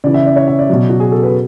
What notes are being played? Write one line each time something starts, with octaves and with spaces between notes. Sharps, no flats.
C#3 E3 D5
E5
D5
C#5
E5
D5
B2 F#3
F#4
G#4
A4
B4